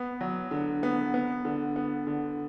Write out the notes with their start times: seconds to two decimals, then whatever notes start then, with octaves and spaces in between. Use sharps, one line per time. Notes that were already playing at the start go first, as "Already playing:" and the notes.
Already playing: B3
0.21 F#3
0.51 D3
0.83 B3
1.14 B3
1.45 D3
1.76 B3
2.07 D3